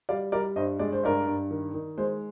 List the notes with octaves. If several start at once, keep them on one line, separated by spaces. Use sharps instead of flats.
G3 D5 F5
G3 A#4 D5
G2 C5 D#5
G#3 D5
C5
G2 A#4 D5
G2
D#3
D#3
G#3 C5